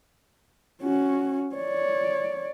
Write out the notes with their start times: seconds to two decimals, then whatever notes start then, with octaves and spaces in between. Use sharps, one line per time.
0.82 C#4 F#4
1.56 C#5 D5